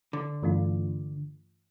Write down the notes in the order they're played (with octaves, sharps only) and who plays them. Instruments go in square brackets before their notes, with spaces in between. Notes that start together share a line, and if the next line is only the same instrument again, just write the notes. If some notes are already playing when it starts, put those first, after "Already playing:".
[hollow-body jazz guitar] D3
[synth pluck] G2 E3 A3 D4 F4